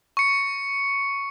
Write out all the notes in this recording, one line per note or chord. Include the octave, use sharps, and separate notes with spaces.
C#6 C#7